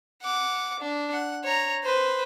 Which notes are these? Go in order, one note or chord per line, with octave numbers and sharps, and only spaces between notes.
F#5 D6
D4
F#5
C#5 A#5
B4 C5